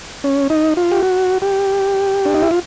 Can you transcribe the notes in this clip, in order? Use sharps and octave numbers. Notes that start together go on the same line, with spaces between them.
C#4
D#4
F4
G4
F#4
G4
D4
D#4
E4
F4